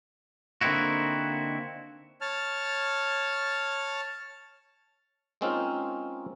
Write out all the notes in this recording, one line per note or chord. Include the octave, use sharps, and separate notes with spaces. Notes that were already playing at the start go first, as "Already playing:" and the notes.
D3 A#3 C4 D#4 E4 F#4
C#5 A5 F6
G#3 A#3 C4 C#4 D#4 F4